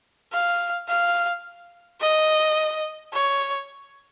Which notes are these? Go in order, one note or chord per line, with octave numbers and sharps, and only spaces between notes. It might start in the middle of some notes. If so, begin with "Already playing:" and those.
F5
F5
D#5
C#5